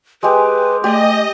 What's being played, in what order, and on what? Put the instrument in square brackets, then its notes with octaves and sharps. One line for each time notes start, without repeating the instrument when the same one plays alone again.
[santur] G#3 G4 [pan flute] B4
[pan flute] A3 [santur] G4 D5 [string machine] D#5